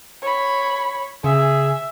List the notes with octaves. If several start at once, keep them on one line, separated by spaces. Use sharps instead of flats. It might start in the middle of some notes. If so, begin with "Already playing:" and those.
C#5 B5
C#3 G#4 E5